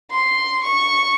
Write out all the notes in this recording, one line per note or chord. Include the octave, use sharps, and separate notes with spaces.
C6
C#6